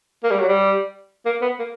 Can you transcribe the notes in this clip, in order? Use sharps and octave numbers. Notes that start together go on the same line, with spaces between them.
A#3
G3
F#3
G3
A#3
B3
A#3